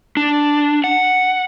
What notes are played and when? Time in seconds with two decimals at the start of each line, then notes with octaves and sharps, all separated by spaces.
0.17 D4
0.84 F#5